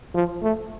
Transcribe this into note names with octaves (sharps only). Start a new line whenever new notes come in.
F3
A3